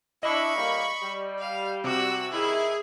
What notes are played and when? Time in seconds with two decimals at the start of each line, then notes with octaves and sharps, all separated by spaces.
0.23 D4 E4 D#5 B5 C#6
0.55 A2 G3 A#3
1.02 G3
1.39 F5
1.84 C3 F#4 D6 E6
2.31 D#3 E4 G#4